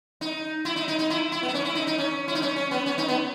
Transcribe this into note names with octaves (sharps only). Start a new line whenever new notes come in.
D#4
E4
D#4
D#4
D#4
E4
E4
B3
D#4
C#4
E4
D#4
D#4
C#4
E4
D#4
C#4
C#4
B3
C#4
D#4
B3